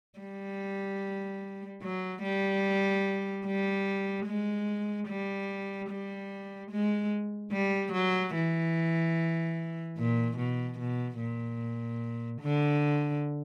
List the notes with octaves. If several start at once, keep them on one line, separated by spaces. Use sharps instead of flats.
G3
F#3
G3
G3
G#3
G3
G3
G#3
G3
F#3
E3
A#2
B2
B2
A#2
D3